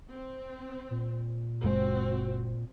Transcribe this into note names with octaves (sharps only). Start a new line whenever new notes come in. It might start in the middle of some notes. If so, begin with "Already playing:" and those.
C4
A#2
F#1 G#3 C4 F#4